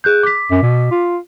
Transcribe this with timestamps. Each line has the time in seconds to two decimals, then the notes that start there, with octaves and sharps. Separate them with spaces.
0.04 G#4 F#6 G6
0.23 D6 B6
0.51 F#2
0.62 B2
0.91 F4